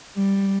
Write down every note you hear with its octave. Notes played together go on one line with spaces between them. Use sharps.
G3